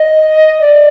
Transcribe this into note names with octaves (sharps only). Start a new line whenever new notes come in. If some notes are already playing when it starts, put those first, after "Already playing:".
Already playing: D#5
D5